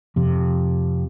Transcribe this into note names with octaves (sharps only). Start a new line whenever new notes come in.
F2 C3